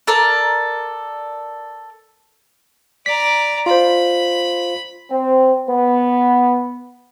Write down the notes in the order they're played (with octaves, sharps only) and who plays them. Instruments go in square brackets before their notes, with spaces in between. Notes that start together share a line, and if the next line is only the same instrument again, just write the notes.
[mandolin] A4 A#4 D5
[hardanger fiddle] D5 A#5 [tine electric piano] B6
[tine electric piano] F4 C5 [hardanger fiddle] B5
[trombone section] C4
B3